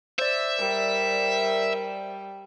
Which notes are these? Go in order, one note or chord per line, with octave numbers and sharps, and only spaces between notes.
C5 D5 E5
G3 A#4